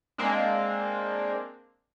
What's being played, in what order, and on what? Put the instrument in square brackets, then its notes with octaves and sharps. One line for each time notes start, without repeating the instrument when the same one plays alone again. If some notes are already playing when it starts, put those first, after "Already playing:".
[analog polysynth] G#3 A#3 C4 D4